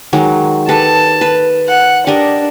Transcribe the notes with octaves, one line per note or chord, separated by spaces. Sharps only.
D#3 F#3 G#3
G4 A4 B4 A5
B4
F#5
D4 G4 A#4 D#5